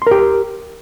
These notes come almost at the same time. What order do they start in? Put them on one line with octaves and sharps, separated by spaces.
C6 A#4 G4